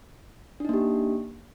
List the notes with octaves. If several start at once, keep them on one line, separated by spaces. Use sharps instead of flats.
A#3 D4 D#4 G4